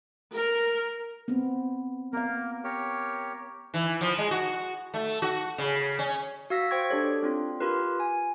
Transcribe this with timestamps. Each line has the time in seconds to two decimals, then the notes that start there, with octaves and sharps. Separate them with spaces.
0.34 A#4
1.28 B3 C4
2.13 A#3 B3 A#4 F5
2.64 G4 A#4 C#5
3.74 E3
4.01 F3
4.18 G#3
4.31 F#4
4.94 A3
5.22 F#4
5.58 C#3
5.99 C#4
6.50 F#4 F5 E6 A#6 B6
6.71 C5 G5 C#6 G#6
6.90 D4 G4 A4 C#5
7.23 C4 D4 F4
7.60 F4 G4 A#4 B4
8.00 G#5